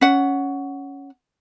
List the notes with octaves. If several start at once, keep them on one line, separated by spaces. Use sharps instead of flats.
C#4 F#5